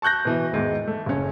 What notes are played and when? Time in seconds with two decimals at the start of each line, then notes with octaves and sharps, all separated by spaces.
0.02 A5 C#6 F#6 G6 A#6
0.25 B2 E3
0.52 E2 G#2 D#3
0.87 A3
1.06 F#1 C#4